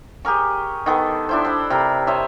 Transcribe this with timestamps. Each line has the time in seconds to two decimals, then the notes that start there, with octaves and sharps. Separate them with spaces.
0.25 G4 G#4 A#4 C#6
0.86 D#3 B3 A4
1.29 D4 E4 C5
1.45 C5 B5
1.70 C3 A#4 B5
2.07 C5 C#5 D#5 E5